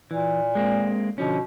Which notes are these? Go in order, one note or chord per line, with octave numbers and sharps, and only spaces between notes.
A#2 E3
G#3 A#3 C4
B2 D3 F3 C#4